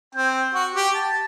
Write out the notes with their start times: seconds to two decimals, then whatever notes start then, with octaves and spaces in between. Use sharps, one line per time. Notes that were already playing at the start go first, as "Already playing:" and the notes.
0.15 C4 G5
0.55 F#4
0.74 G4
0.94 A5